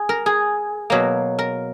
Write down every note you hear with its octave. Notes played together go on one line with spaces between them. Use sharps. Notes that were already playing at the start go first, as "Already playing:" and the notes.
Already playing: G#4
A#4
G#4
B2 F#3 A#3
A#4